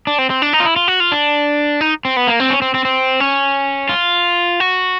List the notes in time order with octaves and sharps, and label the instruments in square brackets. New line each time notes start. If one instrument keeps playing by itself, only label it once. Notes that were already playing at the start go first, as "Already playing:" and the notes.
[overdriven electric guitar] D4
C4
C4
D4
D#4
F4
E4
F4
F#4
F4
D4
D#4
C4
B3
A#3
C4
C#4
C4
C4
C4
C#4
F4
F#4